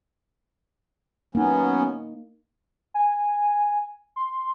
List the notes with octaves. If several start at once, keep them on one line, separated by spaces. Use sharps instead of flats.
F#3 A#3 B3 C#4 D#4
G#5
C6